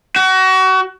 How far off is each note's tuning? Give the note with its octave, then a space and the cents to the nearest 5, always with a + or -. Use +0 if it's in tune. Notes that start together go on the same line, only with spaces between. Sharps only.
F#4 +30